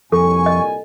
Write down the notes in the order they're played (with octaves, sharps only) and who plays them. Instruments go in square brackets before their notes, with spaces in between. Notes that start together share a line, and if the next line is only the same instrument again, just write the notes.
[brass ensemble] C2 A#2 G#5 [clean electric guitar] F2 [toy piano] A4 [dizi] C#6
[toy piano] D#5